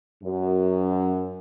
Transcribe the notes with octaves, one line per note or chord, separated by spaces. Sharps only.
F#2